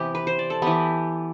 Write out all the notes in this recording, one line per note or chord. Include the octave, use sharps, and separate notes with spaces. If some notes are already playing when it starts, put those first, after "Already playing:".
Already playing: C3 E3 B3 G4
B4
C5
D5
A4
E3 B3 G4